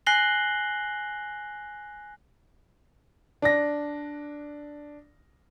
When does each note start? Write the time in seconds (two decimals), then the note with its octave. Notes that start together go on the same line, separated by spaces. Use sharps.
0.07 G#5 F#6 A#6 C7 F#7 G7
3.42 D4 A#6